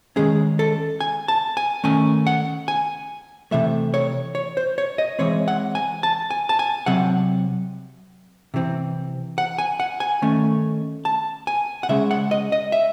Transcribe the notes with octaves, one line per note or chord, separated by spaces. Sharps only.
D#3 G#3 C#4 G#4
A4
G#5
A5
G#5
D#3 A3 C#4 G#5
F#5
G#5
C3 E3 A3 E5
C#5
C#5
C5
C#5
D#5
E3 G#3 C4 C#5
F#5
G#5
A5
G#5
A5
G#5
C3 F#3 C4 F#5
C3 E3 C4
F#5
G#5
F#5
G#5
D#3 A3 C#4
A5
G#5
F#5
C#3 G#3 C#4 E5
F#5
D#5
D#5
E5